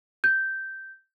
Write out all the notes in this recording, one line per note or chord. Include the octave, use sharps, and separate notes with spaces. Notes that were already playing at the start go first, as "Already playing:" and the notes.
G6